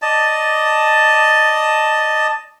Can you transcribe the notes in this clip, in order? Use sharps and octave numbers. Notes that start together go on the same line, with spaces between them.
D5 D#5 A5